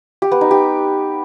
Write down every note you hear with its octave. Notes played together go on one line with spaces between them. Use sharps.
G4
B3
D#4
G4